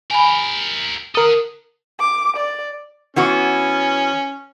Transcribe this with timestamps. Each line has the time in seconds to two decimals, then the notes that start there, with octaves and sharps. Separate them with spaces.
0.11 G4 A#4 G#5 B5
1.15 A4 A#4 F#5 D#6
1.99 D6
2.36 D5
3.16 E3 B3 C#4 F#4